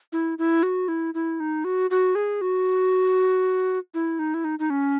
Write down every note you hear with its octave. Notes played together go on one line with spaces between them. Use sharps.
E4
E4
F#4
E4
E4
D#4
F#4
F#4
G#4
F#4
E4
D#4
E4
D#4
D#4
C#4